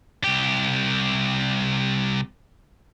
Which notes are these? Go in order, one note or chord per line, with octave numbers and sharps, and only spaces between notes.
C2 G4